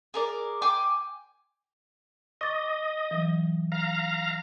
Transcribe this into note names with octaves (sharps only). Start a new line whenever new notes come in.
G#4 A#4 D5
G5 G#5 C6 D6
D#5 C#6 D6 A6
E3 F#3
F5 A#5